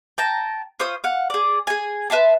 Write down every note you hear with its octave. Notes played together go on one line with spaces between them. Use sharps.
G5 A5 A#5
F4 C5 C#5 D#6
F5 F#5
G#4 D5
G#4 G#5
B4 E5 A5 C6